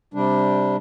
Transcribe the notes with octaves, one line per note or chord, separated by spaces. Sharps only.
C3 G3 D4